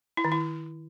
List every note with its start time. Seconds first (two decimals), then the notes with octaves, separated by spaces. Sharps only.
0.17 E4
0.25 D#3
0.32 E4